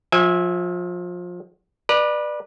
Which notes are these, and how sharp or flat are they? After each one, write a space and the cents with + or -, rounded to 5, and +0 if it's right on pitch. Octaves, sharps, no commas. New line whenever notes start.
F3 +25 E5 -20 G#5 -15
B4 -20 D5 +25 A#5 +0